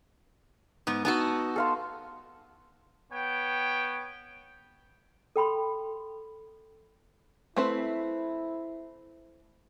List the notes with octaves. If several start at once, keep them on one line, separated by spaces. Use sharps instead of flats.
G#2 B3
B3 D#4 F#4 A5 E6
A4 F5 C6
B3 C#5 G5
A4 G5 B5 C6
A3 C4 E4 B4